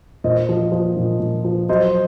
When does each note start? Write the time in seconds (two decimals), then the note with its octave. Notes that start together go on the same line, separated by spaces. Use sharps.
0.24 A#2 C5 D#5
0.49 F3
0.72 F3
0.97 A#2
1.20 A#2
1.45 F3
1.69 F#3 C5 D#5